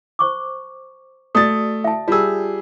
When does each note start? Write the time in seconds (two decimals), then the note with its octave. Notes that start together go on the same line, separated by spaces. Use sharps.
0.19 C5 C#6 D6
1.35 A3 F#4 D5 D#6 A6
1.84 E5 A5
2.08 G3 F4 G#4 E6